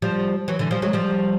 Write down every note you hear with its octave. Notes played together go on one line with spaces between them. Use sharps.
F3 G3
E3 F#3
D3 E3
F3 G3
F#3 G#3
F3 G3